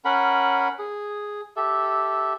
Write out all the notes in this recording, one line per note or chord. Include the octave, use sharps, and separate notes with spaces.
C#4 A#4 F#5 B5
G#4
G4 A4 E5